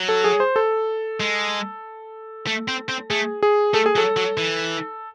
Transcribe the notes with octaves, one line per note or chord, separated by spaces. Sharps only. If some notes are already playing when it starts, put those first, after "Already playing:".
Already playing: F#3
A4
G#4
C5
A4
G#3
A3
C4
C4
A3 G#4
G#4
A3 A4
G#4
F#3 A4
F#3
E3